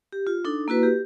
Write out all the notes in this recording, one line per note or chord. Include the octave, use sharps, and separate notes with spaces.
G4
F4
D4 D#4 A4
A#3 E4 F#4 B4
G4